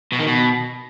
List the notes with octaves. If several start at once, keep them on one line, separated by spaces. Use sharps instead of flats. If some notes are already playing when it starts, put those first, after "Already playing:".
B2
D#3
B2